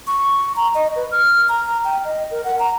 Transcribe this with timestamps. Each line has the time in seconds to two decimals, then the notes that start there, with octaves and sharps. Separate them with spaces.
0.07 C#6
0.56 A#5
0.75 D#5
0.96 B4
1.11 F6
1.49 A#5
1.85 G5
2.05 D#5
2.31 A#4
2.44 F#5
2.59 A#5